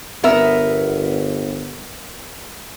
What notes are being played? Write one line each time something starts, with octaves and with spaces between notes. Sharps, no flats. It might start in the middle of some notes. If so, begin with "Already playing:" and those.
G1 B3 A#4 E5